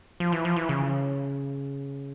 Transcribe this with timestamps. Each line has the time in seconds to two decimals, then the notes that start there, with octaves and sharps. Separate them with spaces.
0.20 F3
0.32 E3
0.45 F3
0.56 E3
0.69 C#3